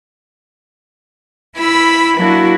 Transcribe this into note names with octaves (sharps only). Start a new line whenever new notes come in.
E4 B5 E6
F#3 A#3 D4 E4 F#4